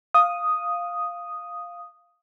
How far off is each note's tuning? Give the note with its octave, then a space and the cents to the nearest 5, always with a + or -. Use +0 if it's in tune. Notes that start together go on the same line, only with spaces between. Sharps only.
F5 +0 D#6 +0